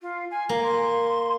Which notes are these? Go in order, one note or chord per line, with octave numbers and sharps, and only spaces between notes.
F4
G#5
A#3 F5
C6